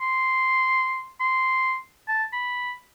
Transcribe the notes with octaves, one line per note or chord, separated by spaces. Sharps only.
C6
C6
A5
B5